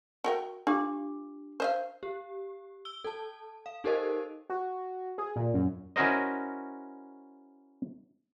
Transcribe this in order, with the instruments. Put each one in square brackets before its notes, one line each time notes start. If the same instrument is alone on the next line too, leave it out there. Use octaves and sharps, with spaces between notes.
[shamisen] F#4 A#4 G5
[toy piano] D4 G4 D6 [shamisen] F4
[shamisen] C5 D#5 F5
[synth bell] G4
E6 G7
A4 A5
F5
D#4 G4 A4 A#4 C5 D#5
[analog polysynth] F#4
G#4
A#2
F#2
[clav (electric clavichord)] C#4 E4 F#4 A#4 C5 D#5